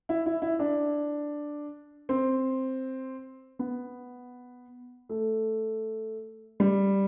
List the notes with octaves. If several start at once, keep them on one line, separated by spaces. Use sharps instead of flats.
E4
E4
E4
D4
C4
B3
A3
G3